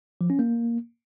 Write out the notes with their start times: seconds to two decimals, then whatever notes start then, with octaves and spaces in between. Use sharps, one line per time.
0.21 F3
0.30 C#4
0.39 A#3